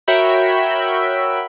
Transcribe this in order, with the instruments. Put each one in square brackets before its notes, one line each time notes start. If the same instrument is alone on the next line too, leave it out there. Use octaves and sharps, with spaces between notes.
[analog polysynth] F#4 A#4 C#5 E5 G5 B5